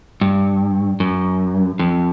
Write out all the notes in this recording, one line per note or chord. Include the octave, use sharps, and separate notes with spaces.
G2
F#2
F2